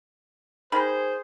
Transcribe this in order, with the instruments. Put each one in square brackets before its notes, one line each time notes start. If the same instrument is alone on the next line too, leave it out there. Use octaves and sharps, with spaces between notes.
[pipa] D#3 [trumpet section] G#4 C5 [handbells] B5